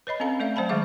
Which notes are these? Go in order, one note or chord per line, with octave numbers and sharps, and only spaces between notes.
B4 C#5 D#5 B5
C4 C#4 A4 F5 A#5
A3 A4 D5 E5 F5
F#3 C5 G5 A5 B5
D#3 G#3 A3 G#4 E5 D6